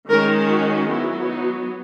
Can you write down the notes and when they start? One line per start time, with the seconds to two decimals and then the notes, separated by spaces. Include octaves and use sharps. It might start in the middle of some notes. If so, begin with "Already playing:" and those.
0.09 D#3 G#3 C#4 A#4
0.49 F#4
0.89 F#3 B3 E4
1.29 D#4